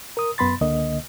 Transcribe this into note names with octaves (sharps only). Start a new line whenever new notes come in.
A#4 D#6
F#2 B3 B5 C6 A6
C#2 D3 A#3 D#5